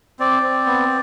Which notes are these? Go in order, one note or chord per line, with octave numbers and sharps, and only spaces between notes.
C4 D5
C4
B3